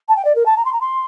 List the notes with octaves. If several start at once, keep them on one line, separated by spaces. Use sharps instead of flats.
A5
G5
D5
A#4
A5
A#5
C6
A#5
C6